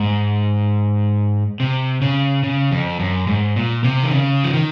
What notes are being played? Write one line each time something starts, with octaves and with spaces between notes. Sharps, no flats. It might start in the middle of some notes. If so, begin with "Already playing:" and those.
Already playing: G#2
C3
C#3
C#3
F2
F#2
G#2
A#2
C3
D#3
C#3
F3
D#3